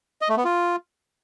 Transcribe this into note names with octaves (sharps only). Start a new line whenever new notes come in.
D#5
A3
B3
F4